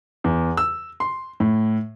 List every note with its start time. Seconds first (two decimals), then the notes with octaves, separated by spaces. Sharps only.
0.24 E2
0.57 E6
1.00 C6
1.40 A2